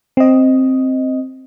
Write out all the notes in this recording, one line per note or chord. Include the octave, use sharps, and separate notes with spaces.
C4 D#5